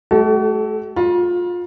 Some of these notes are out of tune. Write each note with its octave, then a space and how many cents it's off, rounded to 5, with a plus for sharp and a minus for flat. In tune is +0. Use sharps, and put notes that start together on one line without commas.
A3 -35 F#4 +40 A4 -10
F4 +20 B5 -45